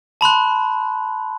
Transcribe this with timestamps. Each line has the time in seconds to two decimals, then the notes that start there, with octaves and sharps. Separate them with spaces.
0.21 A5 B5 C6 F#6